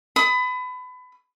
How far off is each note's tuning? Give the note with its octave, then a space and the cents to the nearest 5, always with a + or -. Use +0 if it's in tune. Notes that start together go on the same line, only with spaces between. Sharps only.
B5 +25 D#6 +20